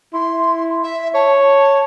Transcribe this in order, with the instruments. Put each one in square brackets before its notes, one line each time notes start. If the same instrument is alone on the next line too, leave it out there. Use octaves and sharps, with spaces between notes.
[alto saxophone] E4 [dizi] C6
[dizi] E5
[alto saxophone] C#5 [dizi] A5